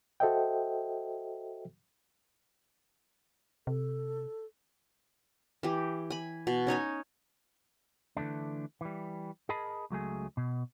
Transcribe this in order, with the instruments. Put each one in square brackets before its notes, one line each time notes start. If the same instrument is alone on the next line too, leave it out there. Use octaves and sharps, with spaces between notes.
[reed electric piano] F#4 A4 C5 D#5 E5 G5
[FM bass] C3 [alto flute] A4
[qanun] E3 G4
G#5 B5
B2
C#4 D#4 C#5 G#5
[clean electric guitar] D3 E3 A3 D4
E3 G3
G#4 A#4 D#5 A5 B5
C#2 F#3 A3 G#4
B2